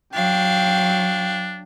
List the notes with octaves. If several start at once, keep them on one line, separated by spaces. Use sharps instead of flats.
F#3 D4 F5 G5